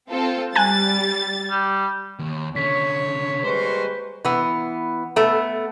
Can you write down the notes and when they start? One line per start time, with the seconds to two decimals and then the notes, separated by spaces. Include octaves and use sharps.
0.10 C4 F4 A4
0.55 G3 G#5 A5 F#6 A6
1.50 G3
2.19 D#2
2.56 D3 C#4 C#5 B6
3.44 G3 G#3 A#3 B4 C5 C6 C#6
4.25 E3 B3
5.16 A3 B3